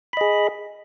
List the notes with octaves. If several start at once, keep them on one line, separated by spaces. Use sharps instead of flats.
G#4 D#5 B5